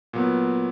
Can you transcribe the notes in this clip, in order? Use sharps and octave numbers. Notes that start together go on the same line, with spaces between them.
A#2 F#3 B3